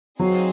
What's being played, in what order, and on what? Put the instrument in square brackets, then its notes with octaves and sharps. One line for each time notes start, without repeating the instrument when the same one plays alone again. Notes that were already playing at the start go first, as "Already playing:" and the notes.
[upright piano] F#3 [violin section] C4 D#4 G#4 C5 F5